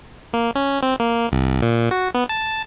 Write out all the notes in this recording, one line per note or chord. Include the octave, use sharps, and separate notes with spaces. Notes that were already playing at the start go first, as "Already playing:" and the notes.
A#3
C#4
C4
A#3
C2
A#2
F#4
B3
A5